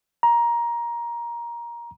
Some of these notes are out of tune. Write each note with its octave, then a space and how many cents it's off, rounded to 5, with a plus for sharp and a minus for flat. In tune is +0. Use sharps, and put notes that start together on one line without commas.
A#5 +15